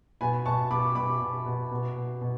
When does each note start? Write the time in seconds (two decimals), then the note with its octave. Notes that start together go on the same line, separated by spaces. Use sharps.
0.21 B2 G#5 B5
0.46 B2 A5 C#6
0.70 B2 B5 D6
0.95 B2 B5 D6
1.20 B2
1.46 B2
1.71 B2
1.96 B2
2.21 B2